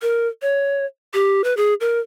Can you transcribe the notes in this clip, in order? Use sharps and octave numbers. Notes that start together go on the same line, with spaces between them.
A#4
C#5
G4
B4
G#4
A#4